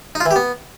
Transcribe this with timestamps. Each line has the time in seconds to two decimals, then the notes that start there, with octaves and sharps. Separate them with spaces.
0.15 D#4
0.20 F4
0.26 E3
0.31 G4
0.36 B3